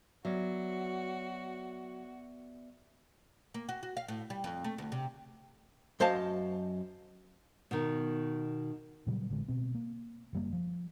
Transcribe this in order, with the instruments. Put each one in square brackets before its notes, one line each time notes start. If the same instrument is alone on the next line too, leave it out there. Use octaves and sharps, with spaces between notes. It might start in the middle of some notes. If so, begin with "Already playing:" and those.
[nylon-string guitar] F#3 [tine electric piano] B3 D5 E5 [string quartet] F#4
[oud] A#3
F#4
F#4
F5
A2
G3
F2
A3
D2
C3
[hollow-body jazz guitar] F#2 C5 D#5 F5 A5
[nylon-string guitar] B2 D#3
[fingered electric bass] A#2 C#3 F#3 G3
A1 D3 G#3
B2 C4
A#3
F#1 G3 A#3
F3